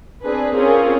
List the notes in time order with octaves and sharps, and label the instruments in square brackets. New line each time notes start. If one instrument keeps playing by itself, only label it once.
[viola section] C4 D4 G#4 B4
C4 C#4 F4 G#4 A#4 C#5